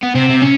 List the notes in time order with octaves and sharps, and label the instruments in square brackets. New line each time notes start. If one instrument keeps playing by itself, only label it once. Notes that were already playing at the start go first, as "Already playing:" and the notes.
[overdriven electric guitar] B3
[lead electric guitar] C3 [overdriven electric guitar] C4
[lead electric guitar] C3
[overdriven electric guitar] C#4